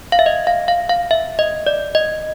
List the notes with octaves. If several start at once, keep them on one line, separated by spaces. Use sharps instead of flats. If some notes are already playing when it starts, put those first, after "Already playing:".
F5
E5
D#5
F5
F5
F5
E5
D#5
D5
D#5